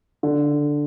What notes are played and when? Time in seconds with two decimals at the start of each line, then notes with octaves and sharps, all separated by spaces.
0.23 D3